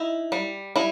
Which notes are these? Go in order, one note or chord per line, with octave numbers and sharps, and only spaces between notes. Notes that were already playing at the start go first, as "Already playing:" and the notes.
Already playing: D#4 E4
G3
G3 E4